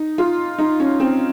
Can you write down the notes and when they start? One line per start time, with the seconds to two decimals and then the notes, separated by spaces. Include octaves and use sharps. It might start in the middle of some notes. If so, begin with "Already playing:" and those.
Already playing: D#4
0.18 F4
0.59 D#4
0.80 C#4
1.00 C4